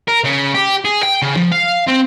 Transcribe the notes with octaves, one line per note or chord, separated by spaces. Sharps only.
A#4
C#3
G4
G#4
G5
C#3
F3
F5
C4